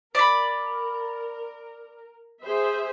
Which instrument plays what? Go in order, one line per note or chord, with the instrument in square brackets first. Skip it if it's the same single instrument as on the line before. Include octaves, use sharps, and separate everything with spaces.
[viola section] A#4 [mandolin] D5 B5
[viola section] G#4 C5 E5